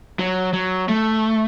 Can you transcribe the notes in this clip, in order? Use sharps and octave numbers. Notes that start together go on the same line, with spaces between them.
F#3
F#3
A3